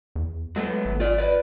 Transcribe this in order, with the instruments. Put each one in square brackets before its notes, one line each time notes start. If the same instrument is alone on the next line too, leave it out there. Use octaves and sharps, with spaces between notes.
[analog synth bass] E2
[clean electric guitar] F#3 A3 B3 [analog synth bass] G#3
[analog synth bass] G#1
[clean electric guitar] F4 D5
B4 D5